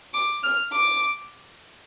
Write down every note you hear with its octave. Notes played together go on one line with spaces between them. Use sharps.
D6
F6
D6